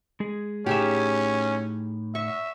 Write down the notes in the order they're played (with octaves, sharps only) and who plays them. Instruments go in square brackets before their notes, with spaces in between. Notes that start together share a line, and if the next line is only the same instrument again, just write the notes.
[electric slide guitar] G#3 G#4
[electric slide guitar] A2 D#4 A#5 [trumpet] C#4 [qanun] G4 G#4 E5
[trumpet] E5 [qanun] C#6